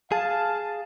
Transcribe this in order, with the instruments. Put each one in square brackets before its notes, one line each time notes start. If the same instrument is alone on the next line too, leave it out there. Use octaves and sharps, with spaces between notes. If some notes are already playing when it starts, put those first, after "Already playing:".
[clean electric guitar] G#4 [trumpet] F5 [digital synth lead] A5